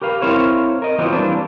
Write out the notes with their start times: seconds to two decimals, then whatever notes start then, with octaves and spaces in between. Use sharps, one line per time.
0.02 G4 A#4 B4 F5
0.22 C4 E4 A#4 C5 C#5 F5
0.82 A#4 D#5
0.98 E3 F#3 B3 C4 F4
1.12 E3 G3 A#3 C4 D4